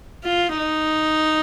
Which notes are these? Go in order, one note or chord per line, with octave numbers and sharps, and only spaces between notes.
F4
D#4